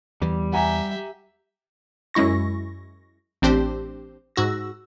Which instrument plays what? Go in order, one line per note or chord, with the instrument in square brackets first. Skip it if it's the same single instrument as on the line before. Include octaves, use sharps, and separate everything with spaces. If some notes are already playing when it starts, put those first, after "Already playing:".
[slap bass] E2 E3 [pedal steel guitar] G3
[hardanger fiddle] G4 E5 [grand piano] F#5 G#5 A#5
[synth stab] F#2 G#3 E4 C#6 A#6
A1 C4 D4 G4 C5
G#2 F#4 E6 A#6